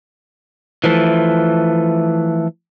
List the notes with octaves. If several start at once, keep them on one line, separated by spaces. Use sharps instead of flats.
E3 F3 A3